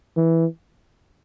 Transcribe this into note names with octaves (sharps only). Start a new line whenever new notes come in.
E3